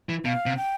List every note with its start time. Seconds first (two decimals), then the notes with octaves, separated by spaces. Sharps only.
0.09 E3
0.25 B2 F5
0.46 C3
0.57 G5